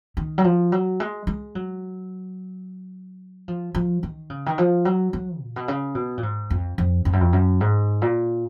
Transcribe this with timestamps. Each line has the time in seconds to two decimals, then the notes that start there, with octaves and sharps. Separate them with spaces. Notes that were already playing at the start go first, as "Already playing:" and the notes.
0.17 D#3
0.38 F#3
0.44 F3
0.72 F#3
1.00 G#3
1.27 G#3
1.55 F#3
3.48 F3
3.75 F3
4.03 D#3
4.30 C#3
4.46 D#3
4.58 F3
4.85 F#3
5.13 F#3
5.40 A#2
5.56 B2
5.68 C#3
5.95 B2
6.17 A#2
6.23 G#2
6.50 F2
6.78 F2
7.05 F2
7.13 F#2
7.21 F2
7.33 F#2
7.61 G#2
8.02 A#2